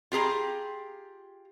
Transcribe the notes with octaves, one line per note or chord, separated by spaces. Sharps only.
F4 G4 G#4 A#5